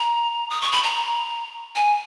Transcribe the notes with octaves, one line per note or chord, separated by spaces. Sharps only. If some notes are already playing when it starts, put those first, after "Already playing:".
Already playing: A#5
D#6
C#6
B5
A#5
G#5